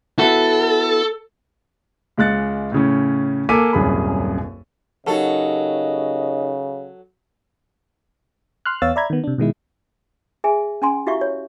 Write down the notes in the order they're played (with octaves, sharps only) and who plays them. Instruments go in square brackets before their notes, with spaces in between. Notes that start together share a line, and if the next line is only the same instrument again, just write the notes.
[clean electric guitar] B3 E4 F#4 [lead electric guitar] A4
[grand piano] C#2 G#3 F#6 A6 C#7
A2 C#3 C#4
A#3 A4 G#5 D6 B6 D#7
D#1 C2 F#2 G#4 B5
[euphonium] C#3 [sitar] F#3 A4 [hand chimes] D#4 G4 A#4 [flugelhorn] D#5
[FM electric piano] C6 F6 F#6
E2 B3 C#5 F5 E6 A6
D5 E5 A#5 B5 G#6
D#3 B3
C3 D4
B2 D#3 G#3 E4
[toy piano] G#4 E5 G#5
C#4 G#5 C6
E4 F#4 G4 E5 F5 C#6
C#5